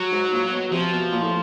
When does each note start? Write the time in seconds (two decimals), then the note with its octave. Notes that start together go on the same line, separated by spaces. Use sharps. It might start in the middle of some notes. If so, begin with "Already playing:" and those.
Already playing: F#3
0.11 G#2
0.32 A#2
0.51 B2
0.72 C3 F3
0.92 B2
1.11 A#2
1.22 A2